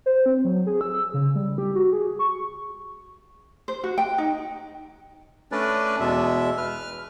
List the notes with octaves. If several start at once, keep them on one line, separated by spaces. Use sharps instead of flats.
C5
C4
F#3
G#4
E6
C#3
G3
G4
F#4
G#4
C#6
C5
F#4
G5
D#4
A3 C#4 D4 B4 D5
E2 B2 G#3 E5
B4 F6